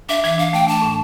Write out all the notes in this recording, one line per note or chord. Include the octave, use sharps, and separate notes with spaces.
D4 E5
E3 E5
D4 F5
A3 G5
D4 A5
A2